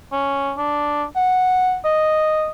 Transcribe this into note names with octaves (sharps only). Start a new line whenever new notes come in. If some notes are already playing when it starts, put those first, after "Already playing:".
C#4
D4
F#5
D#5